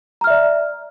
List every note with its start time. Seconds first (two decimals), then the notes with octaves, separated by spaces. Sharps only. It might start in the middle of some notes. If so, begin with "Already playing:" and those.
0.21 A#5
0.24 F6
0.27 E5
0.30 D5